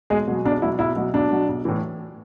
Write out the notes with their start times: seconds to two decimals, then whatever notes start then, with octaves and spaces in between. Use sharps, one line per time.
0.10 B1 G#3 G#4
0.27 B2 F#3
0.45 B1 D4
0.62 B2 E4
0.65 F#3
0.79 B1 E4
0.96 B2 F#3
1.14 B1 D4
1.31 B2 F#3
1.48 B1
1.65 A2 E3